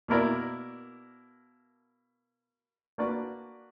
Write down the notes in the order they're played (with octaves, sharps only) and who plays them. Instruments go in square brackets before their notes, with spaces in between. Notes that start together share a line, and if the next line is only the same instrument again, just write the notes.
[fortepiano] B2 A#3 E4 A#4 D5
A#3 D4 F#4 B4 D5